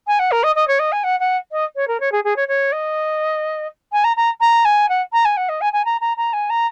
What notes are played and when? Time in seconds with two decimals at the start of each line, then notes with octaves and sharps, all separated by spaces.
0.07 G#5
0.19 F#5
0.32 A#4
0.44 D#5
0.56 D#5
0.68 C#5
0.79 D#5
0.92 G#5
1.04 F#5
1.20 F#5
1.52 D#5
1.76 C#5
1.88 A#4
2.00 C#5
2.12 G#4
2.24 G#4
2.36 C#5
2.48 C#5
2.72 D#5
3.93 G#5
4.04 A#5
4.17 A#5
4.41 A#5
4.65 G#5
4.89 F#5
5.13 A#5
5.25 G#5
5.37 F#5
5.49 D#5
5.61 G#5
5.73 G#5
5.85 A#5
6.01 A#5
6.17 A#5
6.33 G#5
6.50 A#5